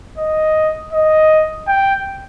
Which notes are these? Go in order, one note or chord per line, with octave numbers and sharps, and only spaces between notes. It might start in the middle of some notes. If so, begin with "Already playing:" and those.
D#5
D#5
G5